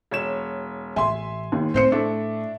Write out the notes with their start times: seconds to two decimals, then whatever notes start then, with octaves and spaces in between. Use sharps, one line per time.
0.11 E1 C#5 E7
0.96 A1 E5 G#5 C6
1.52 D#2
1.74 A2 C4 C5 C#7
1.92 A3 D4 E4